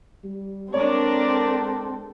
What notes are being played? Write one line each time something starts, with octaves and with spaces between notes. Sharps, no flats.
G3
G#3 C4 D4 A4 A#4 C#5 D5